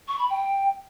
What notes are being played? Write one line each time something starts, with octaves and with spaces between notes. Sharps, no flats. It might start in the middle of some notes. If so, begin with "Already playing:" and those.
C#6
B5
G5